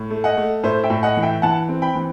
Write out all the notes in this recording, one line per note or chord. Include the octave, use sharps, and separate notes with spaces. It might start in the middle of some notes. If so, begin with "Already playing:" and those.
Already playing: A2
A3
D#5 F#5
A3
A2 C5 E5
E5 G5
A2
D#5 F#5
E3
E5 G5
E3 F#5 A5
C4
G5 B5
E3